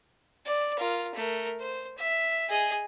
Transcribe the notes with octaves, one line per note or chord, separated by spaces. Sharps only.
D5
F4 A#4
A3 A#4
C5
E5
G#4 D#5